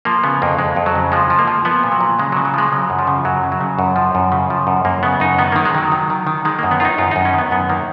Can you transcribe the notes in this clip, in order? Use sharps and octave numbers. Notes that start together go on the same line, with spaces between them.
F3 A#3
C#3 B3
F2 A#3
F2 G#3
F2
F#3
C#3
F3 G#3
F3
A#3
F3
F3 B3
A#2
F#3
A#2
C#3 G#3
F#3
C#3
F#3
F3 G#3
C#3 F#3
F#2
F3
C#3
F#2 F#3
C#3
F#3
C#3
F#2
F3
F#2
C#3
F3
F#2
F#2 A#3
C#3 B3
F#2 D#4
D#3 B3
D#3 A#3
G#3
D#3 F#3
D#3
D#3
D#3
D#3 G#3
A#3
F#2
B3
D#3 D#4 F4
F#2 F4
D#4
F#2
C#4
D#3 B3
F#2 B3
D#3 A#3